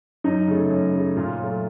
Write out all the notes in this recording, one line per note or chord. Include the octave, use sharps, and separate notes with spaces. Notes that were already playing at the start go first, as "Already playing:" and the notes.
F#2 D#4
C#3 A3
F#2
C#3 A3
A#2 F4
F#3 A3